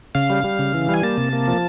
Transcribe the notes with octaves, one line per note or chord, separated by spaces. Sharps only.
C#3 F5
G3
G3
C#3
E3
G3 G#5
A#3 A5
C3
A#3
F3